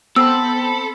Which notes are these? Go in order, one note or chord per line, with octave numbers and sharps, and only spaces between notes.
B3 C4 A4 B5 E6